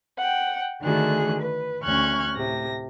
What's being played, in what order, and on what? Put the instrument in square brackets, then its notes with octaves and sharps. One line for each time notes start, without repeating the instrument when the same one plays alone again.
[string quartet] F#5 G5
D3 D#3 A3 F#4 G#4 F#6
B4
D2 C#4 C#6 F6 F#6 G#6
A2 C3 A#6